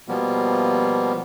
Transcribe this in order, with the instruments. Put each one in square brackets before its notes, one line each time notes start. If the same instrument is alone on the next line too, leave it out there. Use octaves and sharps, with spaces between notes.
[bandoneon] B2 F3 G3 A#3 B3